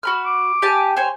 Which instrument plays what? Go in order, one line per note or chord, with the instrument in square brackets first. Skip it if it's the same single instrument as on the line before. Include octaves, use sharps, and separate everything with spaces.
[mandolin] F#4 B5 F6
[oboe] D6
[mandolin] G4 G#5 A5
C5 C#5 G#5